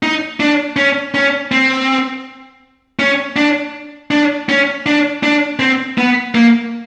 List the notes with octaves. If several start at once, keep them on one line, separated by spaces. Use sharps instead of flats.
D#4
D4
C#4
C#4
C4
C#4
D4
D4
C#4
D4
D4
C4
B3
A#3